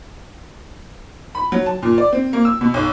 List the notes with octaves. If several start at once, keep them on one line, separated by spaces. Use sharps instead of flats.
B5
F#3
A5
A#2
D5
C4
A#3
E6
B2
B1